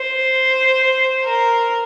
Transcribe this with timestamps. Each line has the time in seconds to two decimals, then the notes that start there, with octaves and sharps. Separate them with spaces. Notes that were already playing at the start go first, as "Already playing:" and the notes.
Already playing: C5
1.24 A#4